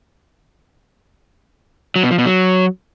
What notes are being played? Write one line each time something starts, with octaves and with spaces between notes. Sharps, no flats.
F#3
B2
F3
B2
F#3